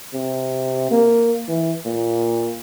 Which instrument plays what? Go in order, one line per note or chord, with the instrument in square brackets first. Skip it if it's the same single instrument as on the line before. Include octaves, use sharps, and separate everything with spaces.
[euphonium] C3
A#3
E3
A#2